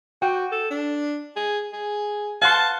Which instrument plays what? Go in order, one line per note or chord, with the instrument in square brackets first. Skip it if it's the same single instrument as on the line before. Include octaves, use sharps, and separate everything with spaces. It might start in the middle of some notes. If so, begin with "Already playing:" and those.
[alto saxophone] F#4 [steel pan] G5
[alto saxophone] A4
D4
G#4
G#4
[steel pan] F5 F#5 C6 [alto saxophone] A5